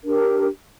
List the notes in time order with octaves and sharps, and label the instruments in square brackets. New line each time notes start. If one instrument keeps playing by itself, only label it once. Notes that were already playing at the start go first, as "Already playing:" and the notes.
[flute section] D4 G4 A#4